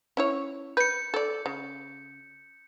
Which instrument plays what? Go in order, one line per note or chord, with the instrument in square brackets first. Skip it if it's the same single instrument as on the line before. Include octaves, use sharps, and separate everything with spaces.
[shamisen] C#4 E4 C#5
[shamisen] B4 [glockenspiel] G6 C#7
[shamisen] A4 D5
C#3